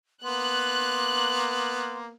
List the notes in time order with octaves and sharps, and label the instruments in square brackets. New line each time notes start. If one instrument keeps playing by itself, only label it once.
[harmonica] A#3 B3 [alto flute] C6 [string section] F#6